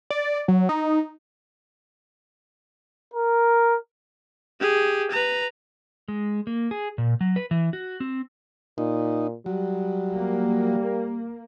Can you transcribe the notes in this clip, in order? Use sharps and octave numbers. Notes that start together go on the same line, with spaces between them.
D5
F#3
D#4
A#4
G4 G#4
B4 A#5
G#3
A#3
G#4
A#2
F#3
B4
E3
F#4
C4
A#2 D#4
F#3 G3
A#3